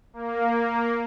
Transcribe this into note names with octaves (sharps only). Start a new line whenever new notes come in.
A#3